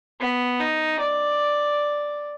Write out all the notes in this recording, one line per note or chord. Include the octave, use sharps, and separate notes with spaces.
B3
D#4
D5